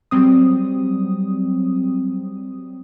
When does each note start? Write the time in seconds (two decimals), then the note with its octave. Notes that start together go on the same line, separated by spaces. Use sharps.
0.11 F#3 G3 C4 D#6